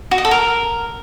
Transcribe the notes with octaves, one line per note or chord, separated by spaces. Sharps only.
F#4
D#5
A4
A#4